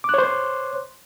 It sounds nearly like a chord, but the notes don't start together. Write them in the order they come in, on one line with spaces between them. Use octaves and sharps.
D6 F#6 C#5 C5 C6